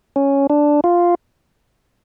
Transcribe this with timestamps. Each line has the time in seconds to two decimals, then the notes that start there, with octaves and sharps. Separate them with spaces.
0.16 C#4
0.50 D4
0.84 F4